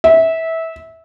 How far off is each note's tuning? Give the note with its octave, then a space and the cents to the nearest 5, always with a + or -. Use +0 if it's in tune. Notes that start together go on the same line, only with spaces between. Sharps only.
E5 -20